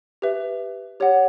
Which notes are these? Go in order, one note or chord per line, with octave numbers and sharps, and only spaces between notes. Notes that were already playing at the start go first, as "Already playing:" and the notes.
G4 B4 E5
G4 C#5 F#5